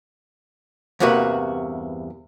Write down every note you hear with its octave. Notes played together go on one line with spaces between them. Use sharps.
E2 G2 C3 A#3 F#4 B4